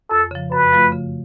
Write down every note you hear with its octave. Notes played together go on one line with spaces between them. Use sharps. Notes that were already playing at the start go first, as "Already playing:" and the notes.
F2 A4
C#3 F3
F#2 B4
F3 A3 F4
C#3